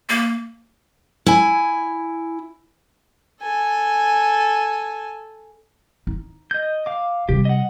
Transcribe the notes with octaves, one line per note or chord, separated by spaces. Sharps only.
A#3
E4 G#5
A4 G#5
D#4
D#5 G6
F5 D6
C3 G3 G4
D#5 F#5